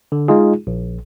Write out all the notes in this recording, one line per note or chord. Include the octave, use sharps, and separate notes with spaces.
D3
G#3 D#4 F4 G#4
A#1